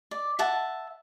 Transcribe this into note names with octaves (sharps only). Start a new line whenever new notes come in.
D5
E5 F#5 A5